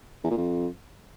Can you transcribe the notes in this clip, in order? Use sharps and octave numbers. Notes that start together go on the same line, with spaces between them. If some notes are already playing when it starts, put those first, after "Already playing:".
E2
A#2
F2